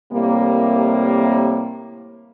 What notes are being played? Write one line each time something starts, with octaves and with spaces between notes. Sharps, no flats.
A2 C3 G3 A#3